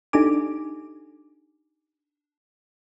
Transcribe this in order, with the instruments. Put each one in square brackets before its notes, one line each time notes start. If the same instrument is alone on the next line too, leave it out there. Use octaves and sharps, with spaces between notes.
[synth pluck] D4 D#4 G4 A4 G#5 D6